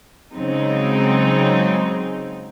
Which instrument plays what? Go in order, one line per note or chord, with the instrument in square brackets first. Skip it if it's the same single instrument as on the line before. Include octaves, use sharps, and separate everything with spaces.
[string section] C#3 F#3 G#3 C4 D#4